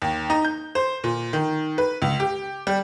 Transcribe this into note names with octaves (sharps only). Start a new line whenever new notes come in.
D#2
D#4
G6
C5
A#2
D#3
B4
C#2
G4
G3